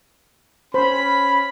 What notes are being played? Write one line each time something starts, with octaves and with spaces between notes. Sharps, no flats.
C#4 C5 B5